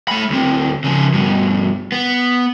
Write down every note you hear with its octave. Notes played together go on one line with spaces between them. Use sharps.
A3 B5
D2 C4
C#3 F3
G2 B2
B3